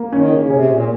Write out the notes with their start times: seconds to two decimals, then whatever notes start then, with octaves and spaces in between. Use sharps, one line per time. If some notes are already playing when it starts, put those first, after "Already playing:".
Already playing: A#3
0.12 D#3 C#4
0.31 C#3
0.42 C#3
0.49 C3 G#4
0.68 A#2